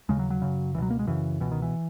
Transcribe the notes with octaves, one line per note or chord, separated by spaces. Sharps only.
D#2 C#3 G#3
F#3
F#3
F#2 C#3
C#2 B2 E3 F#3
A#3
G#3
F#2 C#3 E3
C#2 B2 E3
D#3
E3